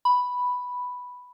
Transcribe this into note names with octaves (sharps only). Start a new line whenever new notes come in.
B5